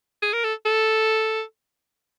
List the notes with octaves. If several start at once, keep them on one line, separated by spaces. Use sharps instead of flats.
G#4
A#4
A4
A4